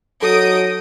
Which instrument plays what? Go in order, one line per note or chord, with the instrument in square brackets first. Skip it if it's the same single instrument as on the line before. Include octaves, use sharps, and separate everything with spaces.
[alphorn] F#3 [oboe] D#4 [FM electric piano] A4 [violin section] D#6 D7